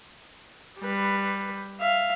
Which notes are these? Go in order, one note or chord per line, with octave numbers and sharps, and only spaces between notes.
G3 B4
E5 F5